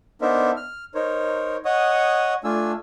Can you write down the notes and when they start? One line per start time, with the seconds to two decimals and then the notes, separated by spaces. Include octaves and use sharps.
0.21 B3 D4 D#4 A#4 C5 E5
0.56 F6
0.95 D#4 A#4 C5 C#5
1.65 C#5 D#5 F#5 C#6 D#6
2.44 A3 D4 F4 G#5 E6